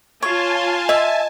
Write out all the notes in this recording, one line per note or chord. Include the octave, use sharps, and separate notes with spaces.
F4 C#5 G#5 A5
D#5 E5